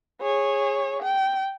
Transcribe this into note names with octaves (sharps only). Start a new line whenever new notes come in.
G#4 C#5
G5